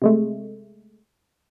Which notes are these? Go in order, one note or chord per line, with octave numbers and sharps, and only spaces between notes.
C3 G#3 A3